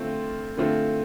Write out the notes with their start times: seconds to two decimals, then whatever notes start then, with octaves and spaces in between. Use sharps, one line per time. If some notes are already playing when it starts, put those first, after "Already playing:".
Already playing: D3 A3 C4 F4
0.57 D3 A3 C4 F4